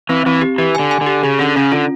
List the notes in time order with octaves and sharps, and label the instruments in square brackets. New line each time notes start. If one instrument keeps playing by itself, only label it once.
[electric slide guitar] E3 [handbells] C4
[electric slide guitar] E3 [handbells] C4
[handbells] G4
[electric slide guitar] E3 [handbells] G4
[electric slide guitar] D3 [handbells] G#5
[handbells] G#5
[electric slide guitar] D3
[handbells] G4
[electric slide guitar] C#3 [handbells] G#4
[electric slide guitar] D3 [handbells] C#4
[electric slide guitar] C#3 [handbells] C#4
[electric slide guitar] D3 [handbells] F4